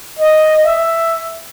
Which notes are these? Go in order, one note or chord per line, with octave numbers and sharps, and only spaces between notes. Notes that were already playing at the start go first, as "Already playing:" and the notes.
D#5
E5